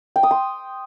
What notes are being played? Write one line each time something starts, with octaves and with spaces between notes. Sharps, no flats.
G5
D#6
C6